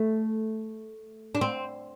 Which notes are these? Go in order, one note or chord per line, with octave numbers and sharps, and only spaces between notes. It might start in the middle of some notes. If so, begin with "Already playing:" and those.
Already playing: A3
D4
C4